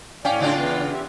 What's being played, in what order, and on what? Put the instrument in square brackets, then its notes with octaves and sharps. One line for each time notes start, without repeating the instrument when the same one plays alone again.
[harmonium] A2 D5 [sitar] C#4 [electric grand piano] F5 G5 G#5
[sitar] C#3 D4 F4
[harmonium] E3 B3
G4 E5